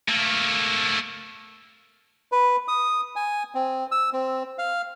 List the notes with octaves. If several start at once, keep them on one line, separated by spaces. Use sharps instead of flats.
A3 A#3
B4
D#6
G#5
C4
E6
C4
F5